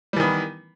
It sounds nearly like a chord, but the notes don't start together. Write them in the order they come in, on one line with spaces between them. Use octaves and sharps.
G3 E3 D#3 B3